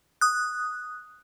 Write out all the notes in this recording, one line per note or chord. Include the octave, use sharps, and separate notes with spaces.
D#6 F#6